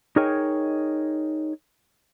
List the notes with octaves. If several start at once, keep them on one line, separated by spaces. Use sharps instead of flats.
D#4 G#4 A#4 C#5 D#5 G5